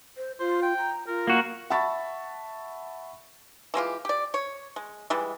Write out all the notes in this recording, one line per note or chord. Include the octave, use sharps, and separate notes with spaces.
C5
F4 C5
G5
A#5
F4 A#4
A#3 F#4
E5 F#5 A5 B5 C#6 A6
E3 G#3 F4 G4
G4 D5
C#5
G#3
E3 G3 G#3